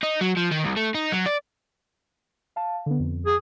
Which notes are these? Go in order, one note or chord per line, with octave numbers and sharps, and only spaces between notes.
D#4
F#3
F3
D#3
C2
A3
D#4
F#3
D5
F5 A5
D3 B3
F2
G#4